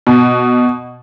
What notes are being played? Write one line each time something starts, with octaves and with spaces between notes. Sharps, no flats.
B2